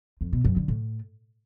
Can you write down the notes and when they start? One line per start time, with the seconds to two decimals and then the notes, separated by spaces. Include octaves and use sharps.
0.21 F2
0.33 B2
0.44 F#2
0.56 D3
0.68 A2